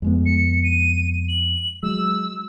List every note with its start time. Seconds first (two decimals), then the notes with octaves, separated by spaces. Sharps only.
0.02 F2 G#3 B3
0.26 C#7
0.64 D#7
1.28 F#7
1.83 F#3 G#3 E6